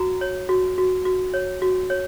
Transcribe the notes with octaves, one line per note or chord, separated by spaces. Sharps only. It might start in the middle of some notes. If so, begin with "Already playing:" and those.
Already playing: F#4 A#5
C#5
F#4
F#4
F#4
C#5
F#4
C#5